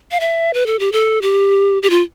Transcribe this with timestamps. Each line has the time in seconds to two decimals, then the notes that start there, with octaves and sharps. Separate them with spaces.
0.11 F5
0.20 E5
0.54 B4
0.66 A4
0.79 G4
0.92 A4
1.22 G4
1.83 G4
1.90 F4